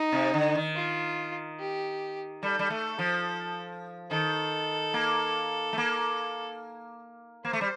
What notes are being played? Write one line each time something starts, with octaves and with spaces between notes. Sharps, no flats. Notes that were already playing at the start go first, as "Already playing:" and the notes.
Already playing: D#4
C3
D3
D#3
F4
G4
G3 A4
G3
A3
F3
D#3 A4
A#3
A3
A#3
A#3 C5
A3
G3